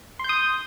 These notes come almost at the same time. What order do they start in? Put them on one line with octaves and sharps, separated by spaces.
C6 G6 D#6